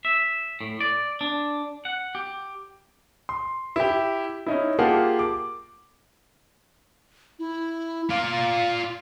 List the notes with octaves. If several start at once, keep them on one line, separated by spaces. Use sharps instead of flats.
E5
A2
D5
D4
F#5
G4
C6
E4 G4
C#4 D#4 E4
A#3 F4 G4 G#4 F#5 A5
D6
E4
F4 D5 F5